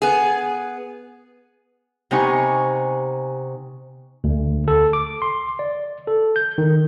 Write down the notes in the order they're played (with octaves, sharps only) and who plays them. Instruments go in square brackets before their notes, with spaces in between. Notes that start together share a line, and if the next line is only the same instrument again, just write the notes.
[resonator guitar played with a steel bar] B3 G#4
[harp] C3 B3 D#4 G#5 C#6
[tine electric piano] D2
A4
D6
C6
D5
A4
G6
D#3